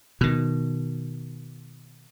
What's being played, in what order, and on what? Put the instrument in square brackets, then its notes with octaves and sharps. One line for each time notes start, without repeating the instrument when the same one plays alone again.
[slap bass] B2 D#3